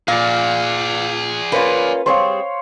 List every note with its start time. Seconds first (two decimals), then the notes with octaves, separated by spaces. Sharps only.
0.08 A#2 G#4 D5 F5
1.52 A#3 C#4 F4 B4
2.06 G3 C4 G#4 C5 C#5 F5